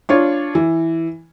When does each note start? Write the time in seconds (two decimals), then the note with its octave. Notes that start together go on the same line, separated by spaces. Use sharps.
0.09 D4 F4 C#5
0.55 E3